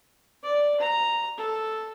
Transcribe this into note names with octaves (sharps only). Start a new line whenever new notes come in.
D5
A#5
A4